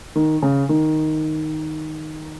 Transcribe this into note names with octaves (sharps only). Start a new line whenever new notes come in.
D#3
C#3
D#3